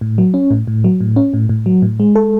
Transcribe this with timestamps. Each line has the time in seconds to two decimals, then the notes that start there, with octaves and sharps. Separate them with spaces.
0.01 A2
0.18 F#3
0.34 C#4
0.51 A2
0.67 A2
0.84 F#3
1.01 A2
1.16 C#4
1.34 A2
1.49 A2
1.66 F#3
1.82 A2
2.00 G#3
2.15 A4